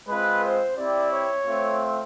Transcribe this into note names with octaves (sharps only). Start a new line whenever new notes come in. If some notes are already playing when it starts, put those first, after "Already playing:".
G#3 C4 F4 B4
C5
C4 E4 G4 D5
C#5
A3 C4 F4